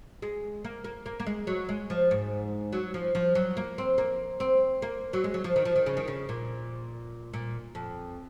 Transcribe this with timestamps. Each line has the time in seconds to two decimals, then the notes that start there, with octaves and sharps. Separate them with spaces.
0.22 G#3
0.64 A#3
0.84 A#3
1.06 A#3
1.20 A#3
1.26 G#3
1.47 F#3
1.69 G#3
1.90 F3
2.11 G#2
2.73 F#3
2.94 F3
3.15 F3
3.35 F#3
3.57 A#3
3.78 C4
3.98 A#3
4.40 C4
4.82 A#3
5.13 F#3
5.24 G#3
5.34 F#3
5.44 F3
5.56 D#3
5.65 F3
5.76 D#3
5.86 C#3
5.97 D#3
6.08 C#3
6.29 A#2
7.33 A#2
7.75 F2